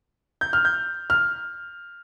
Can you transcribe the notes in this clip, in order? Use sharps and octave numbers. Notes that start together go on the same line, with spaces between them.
G6
F6
G6
F6